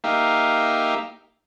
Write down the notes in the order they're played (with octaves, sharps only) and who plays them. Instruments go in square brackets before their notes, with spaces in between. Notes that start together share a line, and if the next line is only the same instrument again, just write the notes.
[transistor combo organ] A#3 D#4 G4 E5 F5